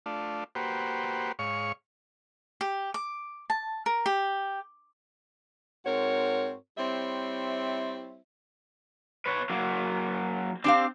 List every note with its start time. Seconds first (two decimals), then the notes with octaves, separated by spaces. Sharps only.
0.06 A3 D4 F4
0.55 A#3 F#4 G4 B4 C5
1.39 G#2 C#5 F5 C#6
2.61 G4
2.94 D6
3.50 A5
3.86 A#4
4.06 G4
5.85 G#2 C4 F#4 A#4 C#5
6.77 G3 C4 E4 C5 C#5 E5
9.26 B4 C#5
9.50 F#3 A#3
10.64 C4 D4 G4 F5